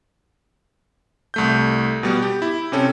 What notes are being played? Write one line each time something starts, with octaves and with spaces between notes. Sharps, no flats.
C2 A3 G6
B2 G3 B3
G4
E4
C3 C4 C#4 A4